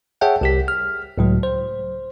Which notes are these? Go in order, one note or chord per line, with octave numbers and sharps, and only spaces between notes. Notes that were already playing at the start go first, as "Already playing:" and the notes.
G#4 C#5 E5 F#5 G5 A5
C2 G4 B6
F6
C#2 A2 F#3
C5